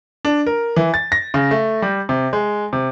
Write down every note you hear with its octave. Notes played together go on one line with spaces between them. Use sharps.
D4
A#4
E3
A6
A#6
C#3
A3
G3
C3
G#3
C3